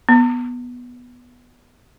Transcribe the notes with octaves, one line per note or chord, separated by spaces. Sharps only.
B3